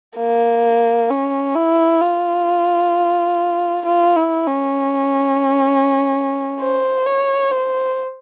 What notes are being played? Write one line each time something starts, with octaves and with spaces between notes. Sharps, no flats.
A#3
C#4
E4
F4
F4
E4
C#4
C5
C#5
C5